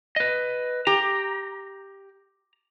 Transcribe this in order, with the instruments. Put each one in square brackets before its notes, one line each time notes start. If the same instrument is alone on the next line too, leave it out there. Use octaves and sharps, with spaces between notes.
[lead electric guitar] B4 D#5
[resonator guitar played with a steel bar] G4 [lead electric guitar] A#5